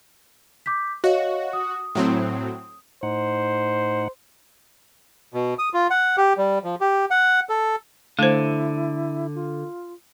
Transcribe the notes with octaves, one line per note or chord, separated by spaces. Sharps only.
D6 G6 B6
F#4 C#5 D#5 F5
D#6
A2 F#3 C4
A2 D#4 C5 F#5
B2
D#6
F4
F#5
G4
G3
F3
G4
F#5
A4
D3 A3 E4 C5
F4